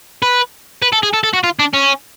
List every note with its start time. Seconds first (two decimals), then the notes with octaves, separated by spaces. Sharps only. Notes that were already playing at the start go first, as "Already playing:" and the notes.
0.22 B4
0.82 B4
0.93 A4
1.03 G#4
1.13 A4
1.23 A4
1.33 F#4
1.44 F4
1.59 D4
1.74 C#4